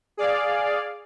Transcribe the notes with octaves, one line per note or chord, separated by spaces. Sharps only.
G#4 D5 F5